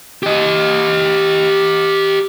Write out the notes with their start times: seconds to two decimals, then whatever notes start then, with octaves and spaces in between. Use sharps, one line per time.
0.23 G4 D#5